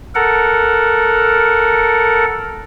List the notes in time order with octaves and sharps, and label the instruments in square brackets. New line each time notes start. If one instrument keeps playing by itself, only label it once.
[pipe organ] A4 A#4 F#5